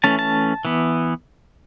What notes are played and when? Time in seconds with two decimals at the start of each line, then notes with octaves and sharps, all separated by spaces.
0.04 E3 A3 C#4 A5
0.19 A5
0.65 E3 B3